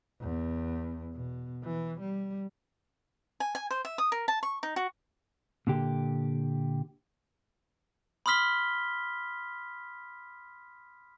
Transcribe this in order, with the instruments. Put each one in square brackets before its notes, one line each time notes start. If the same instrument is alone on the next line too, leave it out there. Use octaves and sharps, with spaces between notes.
[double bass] E2
B2
E3
G3
[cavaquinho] G#5
G#5
C5
E5
D#6
A#4
A5
C#6
D#4
F#4
[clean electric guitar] A#2 D3 G4
[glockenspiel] B5 C6 D#6 F6 B6 G7